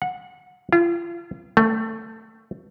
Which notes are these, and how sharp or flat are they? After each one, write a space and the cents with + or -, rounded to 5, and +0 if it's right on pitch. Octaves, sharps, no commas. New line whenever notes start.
F#5 -20
F4 -35
A3 +15